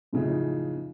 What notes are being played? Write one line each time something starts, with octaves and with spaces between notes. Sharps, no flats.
F#2 A2 C#3 F3 D#4